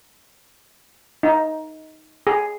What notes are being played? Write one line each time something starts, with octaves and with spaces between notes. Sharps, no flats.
D#4
G#4